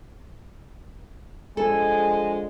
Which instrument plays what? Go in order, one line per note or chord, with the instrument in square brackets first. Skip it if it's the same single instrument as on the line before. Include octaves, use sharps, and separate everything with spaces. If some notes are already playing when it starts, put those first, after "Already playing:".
[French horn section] D3 F3 G#3 [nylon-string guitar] A4 [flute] G#5